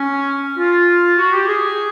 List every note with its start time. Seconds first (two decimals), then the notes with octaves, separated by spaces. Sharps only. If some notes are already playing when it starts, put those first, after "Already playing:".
Already playing: C#4
0.57 F4
1.18 F#4
1.32 G4
1.47 G#4